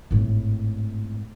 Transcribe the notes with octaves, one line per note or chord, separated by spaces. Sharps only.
G#1 A2